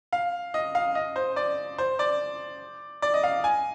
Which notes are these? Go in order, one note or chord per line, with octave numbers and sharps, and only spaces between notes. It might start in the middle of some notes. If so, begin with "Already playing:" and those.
F5
D#5
F5
D#5
C5
D5
C5
D5
D5
D#5
F5
G#5